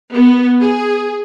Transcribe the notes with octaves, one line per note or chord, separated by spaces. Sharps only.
B3
G#4